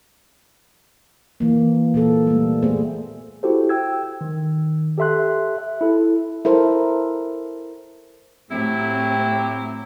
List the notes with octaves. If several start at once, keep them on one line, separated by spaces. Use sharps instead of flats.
E3 A#3
A#2 A#3 A4
G3 A3
A3 B3 G#4 C5
E4 F#4 G4 A4 C5
G5 E6 G#6
D#3
G4 A4 E5 C6 F#6
E5
E4 A4
E4 A4 A#4 C5
A2 F#3 A3 C4 E4 G4